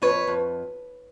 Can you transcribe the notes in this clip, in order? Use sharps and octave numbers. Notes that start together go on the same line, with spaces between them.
F2 B4 C#5
F2